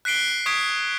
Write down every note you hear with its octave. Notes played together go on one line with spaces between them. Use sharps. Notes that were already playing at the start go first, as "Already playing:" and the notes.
F#6 B6 C7 D7 G7
C#6 D#6 G#6 B6 C7 D7